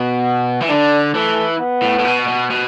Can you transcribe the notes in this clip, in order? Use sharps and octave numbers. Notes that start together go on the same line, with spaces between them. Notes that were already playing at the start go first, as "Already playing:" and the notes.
Already playing: B2
E3
D3 D4
E3 A3
B3
A2
A2
B2
B2
B2